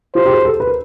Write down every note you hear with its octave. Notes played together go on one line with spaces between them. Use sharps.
F4 G4 C5
G4
F#4 G#4
G4 A4
B4
A#4